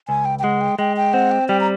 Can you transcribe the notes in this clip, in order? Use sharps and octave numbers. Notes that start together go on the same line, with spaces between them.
C#2 G#5
G5
G5
G#3 F#5
G5
G#3 G5
G5
C4 F#5
G5
G3 G5
A#5